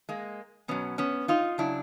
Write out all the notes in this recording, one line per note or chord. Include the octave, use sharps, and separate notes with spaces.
G#3 A#3
B2 F#3 B3 C#4
B3 C#4
D#4 F4
C#3 F#3 D4 E4